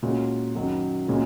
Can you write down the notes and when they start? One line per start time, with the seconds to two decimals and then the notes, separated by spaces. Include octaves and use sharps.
0.03 A#2 G#3 C#4 F#4
0.55 F#2 D#3 F#3 C#4
1.08 A#2 G#3 C#4 F#4